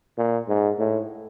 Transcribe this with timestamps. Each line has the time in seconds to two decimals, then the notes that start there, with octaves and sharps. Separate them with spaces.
0.18 A#2
0.48 G#2
0.79 A2